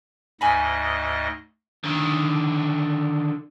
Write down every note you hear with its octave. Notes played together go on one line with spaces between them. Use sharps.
D2 G#2 D#5 G#5 B5
D3 D#3